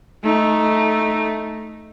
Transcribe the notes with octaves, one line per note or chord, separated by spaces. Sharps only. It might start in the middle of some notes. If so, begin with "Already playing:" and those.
A3 D#4